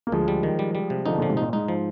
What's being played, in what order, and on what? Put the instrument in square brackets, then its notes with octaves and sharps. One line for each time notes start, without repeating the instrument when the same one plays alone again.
[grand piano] A#3
[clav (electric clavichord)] D2 [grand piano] F3 G#3
[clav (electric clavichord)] G3
D#3
G3
G3
C3
[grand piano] D3 F3 [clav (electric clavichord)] D#4
[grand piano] A#2 D3 [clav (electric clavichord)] F3
[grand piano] G#2 C3
[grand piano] A#2 [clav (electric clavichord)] D#4
[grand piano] G#2 [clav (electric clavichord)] D#4
[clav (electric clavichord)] F3